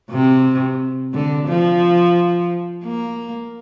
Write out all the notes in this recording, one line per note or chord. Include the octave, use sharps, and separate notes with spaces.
C3
D3
F3
A#3